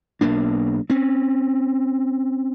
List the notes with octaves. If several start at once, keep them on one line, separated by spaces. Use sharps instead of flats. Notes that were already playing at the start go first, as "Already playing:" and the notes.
B1 B2 A#3 D4
C4 C#4